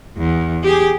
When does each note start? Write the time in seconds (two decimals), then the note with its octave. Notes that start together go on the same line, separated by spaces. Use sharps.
0.17 E2
0.63 G4 G#4